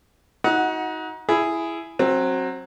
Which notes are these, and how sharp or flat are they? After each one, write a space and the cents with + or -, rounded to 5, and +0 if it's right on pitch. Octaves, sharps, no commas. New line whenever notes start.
D#4 +30 F#4 -10 F#5 +0
E4 +10 G#4 +0
F#3 +0 C4 +25